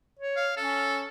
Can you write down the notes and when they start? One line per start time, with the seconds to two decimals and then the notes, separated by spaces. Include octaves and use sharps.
0.19 C#5
0.36 F5
0.57 C#4 A4